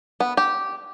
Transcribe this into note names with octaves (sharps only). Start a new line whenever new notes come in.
B3
G4